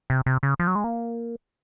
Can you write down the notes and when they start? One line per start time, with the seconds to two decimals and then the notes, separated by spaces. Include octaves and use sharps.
0.10 C3
0.26 C3
0.43 C#3
0.59 F3
0.67 F#3
0.75 G#3
0.84 A#3